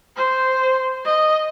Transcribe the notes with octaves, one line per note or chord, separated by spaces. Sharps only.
C5
D#5